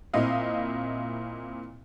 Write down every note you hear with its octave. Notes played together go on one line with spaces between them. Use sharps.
A#2 C4 E4 D#5 F5